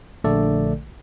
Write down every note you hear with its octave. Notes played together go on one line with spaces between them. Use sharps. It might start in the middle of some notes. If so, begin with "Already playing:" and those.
A#1 D3 A3 A4 D5